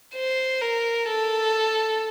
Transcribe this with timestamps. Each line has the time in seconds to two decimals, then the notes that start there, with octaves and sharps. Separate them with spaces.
0.15 C5
0.61 A#4
1.08 A4